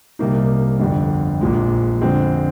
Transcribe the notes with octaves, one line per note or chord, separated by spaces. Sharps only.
C2 C3 G3 A#3 D#4
G1 F2 D3
A#1 A#2 F3 G#3
F2 D3 G#3 C4